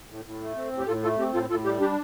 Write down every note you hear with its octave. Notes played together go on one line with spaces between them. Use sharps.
A2
A2
A3
C4
A2
G4
A2 F4 A4
A3 F4 A4
C4 G4
A2 F4 A4
A2 F4 A4
G3 G4
D4 G4